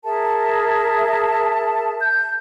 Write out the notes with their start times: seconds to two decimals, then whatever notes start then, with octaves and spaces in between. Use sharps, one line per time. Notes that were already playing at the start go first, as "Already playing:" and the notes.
0.04 G#4 A#4 E5 A5
2.00 G6